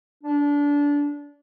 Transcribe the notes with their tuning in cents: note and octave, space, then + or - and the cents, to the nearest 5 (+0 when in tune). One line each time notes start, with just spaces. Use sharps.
D4 -25